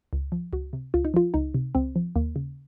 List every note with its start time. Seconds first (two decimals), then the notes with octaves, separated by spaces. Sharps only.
0.13 C#2
0.32 F3
0.53 C#2 F#4
0.73 C3
0.94 C#2 F4
1.05 D#4
1.14 F3 F4
1.34 C#2 D#4
1.54 C3
1.75 C#2 C4
1.96 F3
2.16 D#2 A#3
2.36 C#3